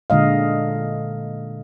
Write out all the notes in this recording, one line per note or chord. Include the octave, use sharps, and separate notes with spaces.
A#2 D3 G#3 D#5 F5